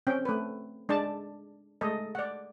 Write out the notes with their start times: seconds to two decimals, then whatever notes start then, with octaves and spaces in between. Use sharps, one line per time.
0.07 C4 C#4 G5
0.25 A3 B4
0.89 G#3 D4 D5 A5
1.81 G#3 A3 A4 D#5
2.15 D5 F#5